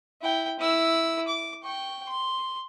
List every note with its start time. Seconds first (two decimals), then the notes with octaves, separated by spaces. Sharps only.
0.22 E4 G5
0.59 E4 E6
1.28 D6
1.63 G5 C#6
2.08 C6